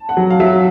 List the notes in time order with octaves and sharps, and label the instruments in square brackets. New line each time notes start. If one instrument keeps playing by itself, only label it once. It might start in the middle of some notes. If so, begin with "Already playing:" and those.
Already playing: [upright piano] A5
F#5
[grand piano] F#3
[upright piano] F5
[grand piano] F#3 [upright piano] E5